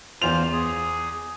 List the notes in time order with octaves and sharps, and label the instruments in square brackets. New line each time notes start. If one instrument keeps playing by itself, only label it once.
[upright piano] E2 F7 [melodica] F4 C5
[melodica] G#4